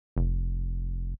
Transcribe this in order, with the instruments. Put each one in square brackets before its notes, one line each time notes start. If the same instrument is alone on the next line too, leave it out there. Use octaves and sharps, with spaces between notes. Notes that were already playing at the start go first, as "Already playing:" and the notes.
[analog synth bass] F1